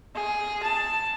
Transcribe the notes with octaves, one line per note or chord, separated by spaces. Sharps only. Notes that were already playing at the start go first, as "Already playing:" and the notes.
G#4
A5